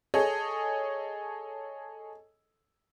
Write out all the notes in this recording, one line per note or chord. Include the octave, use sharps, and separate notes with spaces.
G#4 A4 C#5 D#5